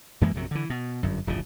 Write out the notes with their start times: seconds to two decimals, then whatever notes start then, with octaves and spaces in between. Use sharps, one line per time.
0.21 F#2 E3 G#3 A#3
0.35 A#1 F#2 C3 F#3
0.51 D3 E3
0.70 B2
1.03 G1 F#2
1.27 D1 G1 C#3 F3